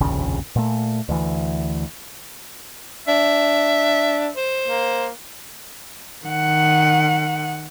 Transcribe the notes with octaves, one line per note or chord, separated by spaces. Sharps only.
F1 A#1 D#2 C#3
A#2 A3
D2 E3
D4 E5
C5
A#3
D#3 F#5